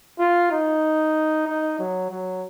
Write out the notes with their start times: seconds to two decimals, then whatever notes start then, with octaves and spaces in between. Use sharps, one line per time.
0.19 F4
0.51 D#4
1.47 D#4
1.79 F#3
2.10 F#3